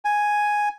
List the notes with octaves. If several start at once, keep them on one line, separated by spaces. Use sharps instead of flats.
G#5